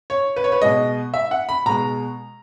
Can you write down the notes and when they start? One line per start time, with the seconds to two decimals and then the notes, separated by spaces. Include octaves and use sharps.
0.10 C#5
0.36 B4
0.44 C#5
0.52 B4
0.61 B2 G#3 D#5
1.14 E5
1.31 F#5
1.49 B5
1.66 B2 G#3 A#5